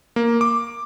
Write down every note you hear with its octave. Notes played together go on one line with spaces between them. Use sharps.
A#3
D6